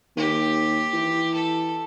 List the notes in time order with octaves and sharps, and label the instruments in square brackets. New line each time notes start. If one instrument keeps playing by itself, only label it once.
[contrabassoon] D#2 [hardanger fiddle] G4
[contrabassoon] E3
[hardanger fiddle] A4